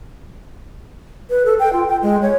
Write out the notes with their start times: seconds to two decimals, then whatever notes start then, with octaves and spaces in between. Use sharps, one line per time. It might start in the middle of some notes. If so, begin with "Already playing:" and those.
1.30 B4
1.46 A4
1.59 G5
1.73 F4
1.88 G5
2.02 G#3
2.22 C#5